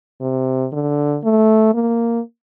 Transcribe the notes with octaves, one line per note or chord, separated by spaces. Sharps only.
C3
D3
A3
A#3